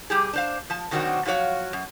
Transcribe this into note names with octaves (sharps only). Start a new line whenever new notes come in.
G3 G4 G#4
D4 C5 F5
F3 A5
B2 D#3 F#3 C4 D4 F#4
F3 F#3 F#4 C#5 F5
F#2